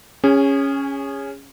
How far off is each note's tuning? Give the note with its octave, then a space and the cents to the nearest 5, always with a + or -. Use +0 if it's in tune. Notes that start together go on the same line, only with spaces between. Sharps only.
C#4 +0 G#4 -25